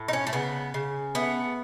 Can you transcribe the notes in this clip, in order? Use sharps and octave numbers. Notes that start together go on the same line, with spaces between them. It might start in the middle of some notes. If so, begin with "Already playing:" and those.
Already playing: A2
D#4
C#4
A3
C#3 B3
C#3
A3 B3